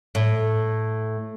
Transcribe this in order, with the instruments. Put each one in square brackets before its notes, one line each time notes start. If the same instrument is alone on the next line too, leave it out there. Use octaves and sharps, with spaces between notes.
[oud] A2